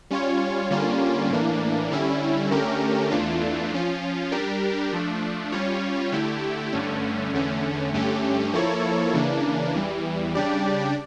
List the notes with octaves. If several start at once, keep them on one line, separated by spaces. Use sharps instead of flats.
G3 C#4 F4 C#5
D3 G3 A#3 C#4 F4
A2 E3 A#3 D4
D3 G3 C#4 E4
D3 A3 C#4 G4 A#4
E2 E3 A3 D4 F4
F3 C#4 F4
G3 D4 G4 A#4
F3 A3 D4
G3 C#4 F4 C#5
D3 A3 E4 G4
G2 D3 A3 C#4
E2 D3 A3 C#4
G2 D3 A3 C#4 G4
F3 A#3 E4 A4 C#5
C#3 E3 A#3 D4
E2 E3 G3
C#3 G3 D4 G4 D5